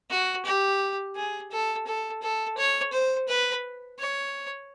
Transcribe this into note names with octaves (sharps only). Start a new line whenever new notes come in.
F#4
G4
G#4
A4
A4
A4
C#5
C5
B4
C#5